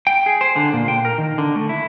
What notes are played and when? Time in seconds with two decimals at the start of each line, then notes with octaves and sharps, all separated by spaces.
0.07 G5
0.26 G#4
0.41 C5
0.56 D3
0.73 A#2
0.88 G5
1.05 A#4
1.18 D#3
1.38 D3
1.56 A3
1.69 E4